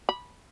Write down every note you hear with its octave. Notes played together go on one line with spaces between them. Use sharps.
B5